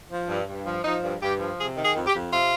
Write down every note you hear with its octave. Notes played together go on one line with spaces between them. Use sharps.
F3
G2
G2
F3
F3 D#4
G2
G2 G4
F3
C3 G#4
D#3
G#4
F2
G4
F2
C3 F4